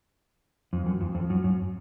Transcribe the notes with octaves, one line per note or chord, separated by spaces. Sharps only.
F2
F#2
F2
F2
F#2
F#2